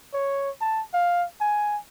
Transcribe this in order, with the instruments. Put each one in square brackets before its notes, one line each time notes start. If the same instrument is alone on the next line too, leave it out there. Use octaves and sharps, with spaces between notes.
[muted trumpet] C#5
A5
F5
G#5